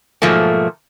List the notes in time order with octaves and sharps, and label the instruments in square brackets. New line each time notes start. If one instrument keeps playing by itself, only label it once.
[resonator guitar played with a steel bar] G#2 B2 F3 F#3 A3 A#3